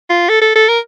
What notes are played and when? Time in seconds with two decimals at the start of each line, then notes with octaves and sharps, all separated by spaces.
0.10 F4
0.29 A4
0.42 A4
0.56 A4
0.69 A#4